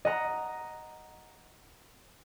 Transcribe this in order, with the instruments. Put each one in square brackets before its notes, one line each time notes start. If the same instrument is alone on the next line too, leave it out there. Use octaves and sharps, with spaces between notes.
[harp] D#5 F#5 A#5